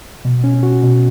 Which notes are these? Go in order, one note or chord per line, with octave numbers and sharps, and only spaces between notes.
B2
C#4
F#4
B2